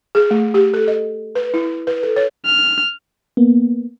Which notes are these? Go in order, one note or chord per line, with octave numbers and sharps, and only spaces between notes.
G#4
A3
G4
A4
D#5
B4
E4
B4
A4
C#5
F6
A#3 B3